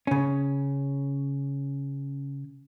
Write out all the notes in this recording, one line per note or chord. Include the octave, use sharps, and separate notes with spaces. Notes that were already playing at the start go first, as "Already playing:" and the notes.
C#3 C#4